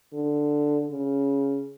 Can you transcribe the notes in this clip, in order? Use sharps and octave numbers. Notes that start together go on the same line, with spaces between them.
D3
C#3